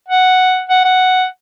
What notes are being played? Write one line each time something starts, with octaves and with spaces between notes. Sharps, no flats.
F#5
F#5
F#5